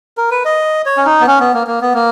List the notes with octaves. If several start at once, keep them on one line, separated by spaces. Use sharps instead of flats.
A#4
B4
D#5
C#5
C#4
D#4
B3
C#4
B3
A#3
A#3
B3
A#3